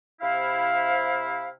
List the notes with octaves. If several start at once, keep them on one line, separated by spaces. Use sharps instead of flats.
C3 E4 F5